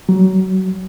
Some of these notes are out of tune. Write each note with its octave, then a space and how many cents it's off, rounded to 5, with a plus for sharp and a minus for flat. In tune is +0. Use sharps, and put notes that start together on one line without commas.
F#3 +25